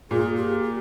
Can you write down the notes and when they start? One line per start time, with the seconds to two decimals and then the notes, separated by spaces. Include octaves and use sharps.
0.11 A#2 G#4
0.36 G4
0.63 G4